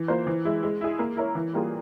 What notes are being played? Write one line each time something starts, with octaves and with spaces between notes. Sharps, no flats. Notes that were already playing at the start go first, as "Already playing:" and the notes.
Already playing: E3
A#3 F4 C5
E3
G#3 E4
G#3
E4 G#4
A#3
E4 A#4 C#5
E3
G3 A#3 F4 G#4